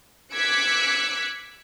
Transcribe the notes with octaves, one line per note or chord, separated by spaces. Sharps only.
D6 E6 F#6 G#6 B6 C#7